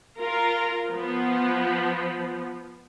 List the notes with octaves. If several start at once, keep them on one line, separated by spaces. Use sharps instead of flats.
F4 A#4
F3 B3